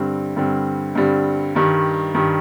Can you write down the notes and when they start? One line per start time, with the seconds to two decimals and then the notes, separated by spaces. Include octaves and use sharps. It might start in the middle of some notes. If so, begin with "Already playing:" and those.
Already playing: G2 D3 G3 C4
0.36 G2 D3 G3 C4
0.95 G2 D3 G3 C4
1.55 G2 D#3 G3
2.15 G2 D#3 G3